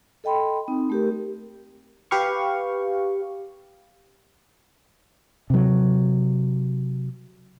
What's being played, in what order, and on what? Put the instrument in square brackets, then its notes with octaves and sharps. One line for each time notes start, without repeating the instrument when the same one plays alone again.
[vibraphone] A4 D#5 G5 B5 C6
C4 D#4
A3 G4 A#4
[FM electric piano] G4 B4 F5 C#6
[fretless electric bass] C3 F#3